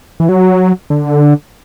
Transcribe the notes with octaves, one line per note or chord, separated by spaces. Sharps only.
E3
F#3
D3